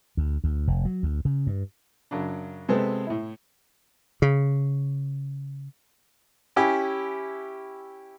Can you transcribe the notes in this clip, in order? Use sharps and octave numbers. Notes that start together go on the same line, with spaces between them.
D2
D2
F1
F#3
D2
C#3
G2
F#2 C#3 D4
C3 G#3 B3 C4 A4
A2 E4
C#3
C#4 E4 G4 G#5